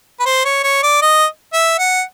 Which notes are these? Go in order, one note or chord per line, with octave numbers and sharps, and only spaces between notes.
B4
C5
C#5
C#5
D5
D#5
E5
F#5